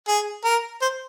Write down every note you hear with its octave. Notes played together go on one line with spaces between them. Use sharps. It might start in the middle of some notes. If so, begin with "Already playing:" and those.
G#4
A#4
C5